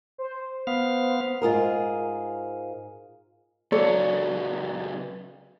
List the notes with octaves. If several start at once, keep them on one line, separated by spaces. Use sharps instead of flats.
C5
B3 F5
G#2 F4 G#4 A#4
C#2 F#3 A4 C#5 D5